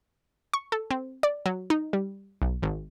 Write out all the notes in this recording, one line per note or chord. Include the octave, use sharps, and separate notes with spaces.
C#6
A4
C4
D5
F#3
D#4
G3
B1
G#1